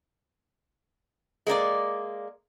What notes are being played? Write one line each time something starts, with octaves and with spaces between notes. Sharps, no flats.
G#3 A#3 D4 D5